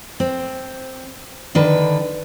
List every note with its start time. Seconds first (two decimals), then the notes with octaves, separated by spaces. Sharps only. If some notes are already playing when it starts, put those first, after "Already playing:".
0.20 C4
1.55 D3 D#3 D4 B4